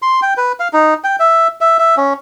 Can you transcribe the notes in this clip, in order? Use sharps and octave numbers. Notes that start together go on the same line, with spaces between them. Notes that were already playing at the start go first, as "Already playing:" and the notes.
C6
G5
B4
F5
D#4
G5
E5
E5
E5
C#4